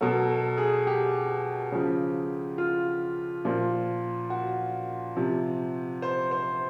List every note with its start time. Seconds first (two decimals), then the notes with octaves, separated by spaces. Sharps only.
0.01 B2 F#3 A4
0.29 A4
0.58 G#4
0.87 G4
1.72 C#3 F3
2.58 F4
3.45 A#2 F3
4.30 F#4
5.16 C3 F3
6.02 C5
6.31 C5